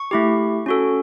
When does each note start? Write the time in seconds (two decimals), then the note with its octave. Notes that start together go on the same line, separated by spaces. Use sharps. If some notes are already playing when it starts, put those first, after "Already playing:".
Already playing: C#6
0.11 A3 E4 G4
0.66 C#4 F#4 A4